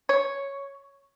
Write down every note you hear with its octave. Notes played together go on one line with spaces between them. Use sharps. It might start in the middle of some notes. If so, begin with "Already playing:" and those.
C#5